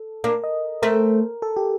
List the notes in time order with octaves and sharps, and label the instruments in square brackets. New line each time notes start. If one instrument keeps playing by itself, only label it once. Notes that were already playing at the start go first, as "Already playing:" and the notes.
Already playing: [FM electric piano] A4
[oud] A#3 D4 [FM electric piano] A#4
[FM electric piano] D#5
[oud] A3 C4 [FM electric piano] A#4
[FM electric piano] A4
G4